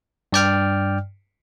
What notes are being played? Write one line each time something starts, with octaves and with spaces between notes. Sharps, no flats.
G2 D5 G5 F6